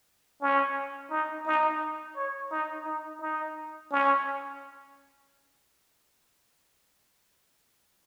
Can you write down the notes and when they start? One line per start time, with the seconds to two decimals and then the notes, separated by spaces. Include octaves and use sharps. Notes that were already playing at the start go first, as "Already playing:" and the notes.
0.41 C#4
1.11 D#4
1.46 D#4
2.17 C#5
2.52 D#4
2.86 D#4
3.21 D#4
3.91 C#4